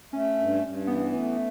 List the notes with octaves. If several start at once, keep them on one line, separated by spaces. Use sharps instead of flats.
A3 C#4
G2
G2
E3 B3
A3